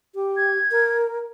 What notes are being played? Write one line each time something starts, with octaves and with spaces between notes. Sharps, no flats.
G4
G#6
A#4